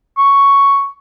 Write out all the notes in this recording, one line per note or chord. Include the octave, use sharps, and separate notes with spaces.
C#6